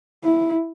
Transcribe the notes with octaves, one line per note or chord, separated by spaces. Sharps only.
E4